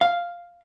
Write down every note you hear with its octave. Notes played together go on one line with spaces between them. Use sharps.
F5